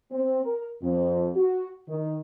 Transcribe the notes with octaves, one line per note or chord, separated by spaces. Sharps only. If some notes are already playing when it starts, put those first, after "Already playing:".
C4
A#4
F2
F#4
D#3